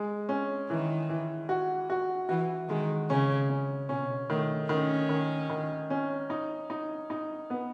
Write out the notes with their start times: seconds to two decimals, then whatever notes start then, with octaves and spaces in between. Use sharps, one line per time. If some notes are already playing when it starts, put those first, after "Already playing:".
Already playing: G#3
0.29 C#4
0.69 D#3 E3
1.09 E3
1.49 F#4
1.90 F#4
2.29 E3 F#4
2.69 D#3 G#3
3.09 C#3 C#4
3.49 C#4
3.89 B2 C#4
4.30 D#3 A3
4.69 D#3 C#4
5.09 D#3
5.50 D#3
5.90 C#4
6.30 D#4
6.70 D#4
7.10 D#4
7.50 B3